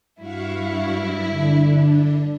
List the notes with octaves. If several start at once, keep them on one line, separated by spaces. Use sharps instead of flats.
G2 E4 F#4 F5 C#6
D3 D4